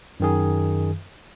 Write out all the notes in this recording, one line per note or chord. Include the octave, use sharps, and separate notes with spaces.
F#2 D#3 G#4